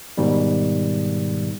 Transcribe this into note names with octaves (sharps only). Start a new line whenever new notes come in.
G#2 B2 D#3 G3